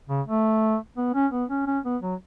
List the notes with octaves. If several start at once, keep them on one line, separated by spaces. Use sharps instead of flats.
C#3
A3
B3
C#4
B3
C#4
C#4
B3
F#3